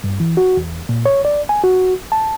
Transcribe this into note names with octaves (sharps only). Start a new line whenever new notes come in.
G2
E3
F#4
E2
A#2
C#5
D5
G#5
F#4
A5